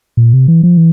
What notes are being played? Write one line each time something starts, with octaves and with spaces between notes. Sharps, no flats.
A#2
C3
E3
F3
E3